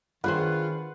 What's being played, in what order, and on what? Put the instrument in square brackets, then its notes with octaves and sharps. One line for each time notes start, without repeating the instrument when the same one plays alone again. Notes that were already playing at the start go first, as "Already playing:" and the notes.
[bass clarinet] D#3 [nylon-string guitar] D4 G#4 C5 [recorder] F4 [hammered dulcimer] B4 F#5